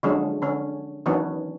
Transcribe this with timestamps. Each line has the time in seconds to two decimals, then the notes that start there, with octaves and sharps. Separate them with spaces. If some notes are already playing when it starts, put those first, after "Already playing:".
0.03 D3 F3 F#3 G#3 C#4
0.42 D3 C#4
1.06 D#3 E3 F#3 B3 C#4 D4